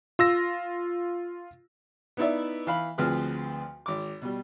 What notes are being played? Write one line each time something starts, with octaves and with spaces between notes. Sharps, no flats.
F4 E6 A#6
B3 D#4 E4 D5 E5
E3 F5 B5
D2 F3 C4 G#4 B4 F6
G#1 D6
B2 G3